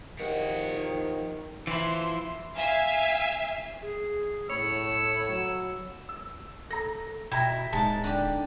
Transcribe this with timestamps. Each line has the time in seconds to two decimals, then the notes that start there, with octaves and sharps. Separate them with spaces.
0.19 E2 C3 D#3 F3 F#5
1.67 E3 F3 E4 C6
2.56 E5 F5 G#5
3.82 G#4
4.50 A2 C#5 B5 E6
5.30 F#3
6.09 E6
6.71 A4 A#5 A#6
7.32 B2 E4 G5 A#5 A#6
7.73 D1 G#3 D#4 A5
8.04 D3 G4